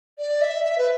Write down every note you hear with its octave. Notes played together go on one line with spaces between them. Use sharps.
D5
E5
E5
B4